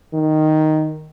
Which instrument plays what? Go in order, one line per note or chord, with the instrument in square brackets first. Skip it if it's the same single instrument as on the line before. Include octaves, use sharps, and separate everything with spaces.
[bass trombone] D#3